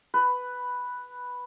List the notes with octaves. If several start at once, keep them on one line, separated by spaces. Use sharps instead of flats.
B4